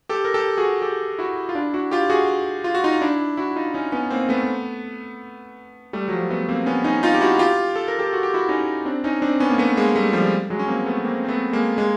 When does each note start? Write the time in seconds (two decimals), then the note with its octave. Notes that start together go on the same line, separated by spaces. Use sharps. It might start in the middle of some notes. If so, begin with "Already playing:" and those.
0.09 G4 A4
0.25 A#4
0.34 G4 A4
0.57 F#4 G#4
0.82 G4 A4
1.19 E4 F#4
1.49 F4
1.55 D4 E4
1.74 E4 F#4
1.91 F4 G4
2.10 F#4 G#4
2.64 F4
2.75 F#4
2.84 D#4 F4
3.01 D4 E4
3.37 E4 F#4
3.56 D#4 F4
3.74 C#4 D#4
3.92 B3 C#4
4.10 A#3 C4
4.29 A3 B3
5.93 G3 A3
6.08 F#3
6.12 F3 G3
6.30 A3 B3
6.49 A#3 C4
6.66 B3 C#4
6.84 C#4 D#4
7.03 D#4 F4
7.14 G4
7.21 E4 F#4
7.39 F4 G4
7.76 A4
7.88 A#4
7.99 G4 A4
8.13 F#4
8.23 G4
8.34 E4 F#4
8.49 C#4 D#4
8.85 C4 D4
9.04 C#4 D#4
9.22 C4 D4
9.40 B3 C#4
9.50 A#3
9.58 A3 B3
9.77 G#3 A#3
9.95 G3 A3
10.13 F3 G3
10.50 F#3 G#3
10.59 C#4
10.68 A#3 C4
10.86 A3 B3
11.05 A#3 C4
11.25 C4
11.29 A3 B3
11.53 G#3 A#3
11.78 G#3 A#3